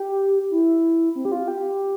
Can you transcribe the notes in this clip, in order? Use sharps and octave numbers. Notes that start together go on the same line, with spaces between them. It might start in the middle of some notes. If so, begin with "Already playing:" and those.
Already playing: G4
E4
C4
G4
F4
G4